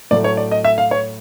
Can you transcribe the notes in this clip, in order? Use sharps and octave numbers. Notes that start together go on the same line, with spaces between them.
A2 F#3 A3 D5
C#5
D5
D#5
E5
F5
C#5